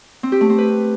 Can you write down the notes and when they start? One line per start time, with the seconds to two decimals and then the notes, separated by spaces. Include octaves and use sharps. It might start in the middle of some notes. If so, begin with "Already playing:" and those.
0.23 C4
0.32 G4
0.41 A3
0.50 C4
0.58 B4